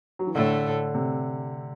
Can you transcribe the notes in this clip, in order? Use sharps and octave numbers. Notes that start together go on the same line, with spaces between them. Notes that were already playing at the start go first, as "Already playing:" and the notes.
F#3
E3
A2 D3 A3
C3